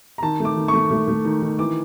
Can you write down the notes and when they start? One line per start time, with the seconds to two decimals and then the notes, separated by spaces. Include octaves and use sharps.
0.18 A#5
0.22 D#3 A5
0.40 A3
0.45 D6
0.56 D#3
0.68 A3 C#6
0.90 A3
1.08 A3
1.25 D#3
1.42 D#3
1.59 E3 D6